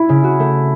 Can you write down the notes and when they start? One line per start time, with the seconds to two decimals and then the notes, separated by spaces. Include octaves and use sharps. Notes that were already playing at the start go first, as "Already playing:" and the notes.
Already playing: E4
0.09 C#3
0.24 F#4
0.40 A3